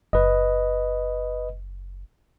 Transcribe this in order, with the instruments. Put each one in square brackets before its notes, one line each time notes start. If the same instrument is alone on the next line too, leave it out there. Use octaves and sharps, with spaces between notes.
[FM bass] F#1 [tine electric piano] B4 D#5